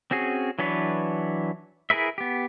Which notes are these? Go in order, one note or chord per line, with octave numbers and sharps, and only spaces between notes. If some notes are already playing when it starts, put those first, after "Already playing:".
C4 C#4 F#4 G#4
E3 F#3 D4 B4 C#5
E4 G#4 A#4 B4 E5
B3 G4